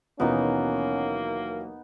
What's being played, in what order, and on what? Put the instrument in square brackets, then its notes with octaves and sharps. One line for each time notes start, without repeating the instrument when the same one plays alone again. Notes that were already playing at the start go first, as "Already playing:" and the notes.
[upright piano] D#2 B2 E3 [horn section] F#3 A#3 [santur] B3 D#4 [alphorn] C#4